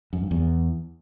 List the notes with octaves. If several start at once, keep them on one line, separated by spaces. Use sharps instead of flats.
F#2
G2
E2